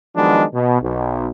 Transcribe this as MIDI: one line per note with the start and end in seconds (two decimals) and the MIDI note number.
0.16 0.44 51
0.16 0.44 53
0.16 0.44 54
0.16 0.44 56
0.16 0.44 59
0.16 0.44 62
0.54 0.81 47
0.82 1.29 35